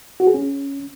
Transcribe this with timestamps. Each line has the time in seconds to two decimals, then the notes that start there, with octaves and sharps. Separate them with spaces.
0.20 F#4
0.27 G#4
0.34 C#4